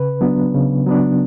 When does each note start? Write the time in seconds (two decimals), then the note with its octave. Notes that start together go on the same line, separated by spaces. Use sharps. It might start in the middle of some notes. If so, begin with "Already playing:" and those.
Already playing: C#3 B4
0.21 F#3 B3 D4
0.54 C#3
0.86 F#3 B3 D4